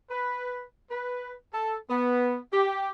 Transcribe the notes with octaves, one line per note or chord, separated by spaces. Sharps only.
B4
B4
A4
B3
G4